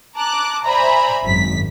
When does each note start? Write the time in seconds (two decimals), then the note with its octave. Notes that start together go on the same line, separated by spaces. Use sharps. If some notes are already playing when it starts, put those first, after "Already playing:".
0.15 A5 A#5 D6 F#6
0.64 C5 D5 E5 G#5 A#5 B5
1.24 G#1 F#2 B6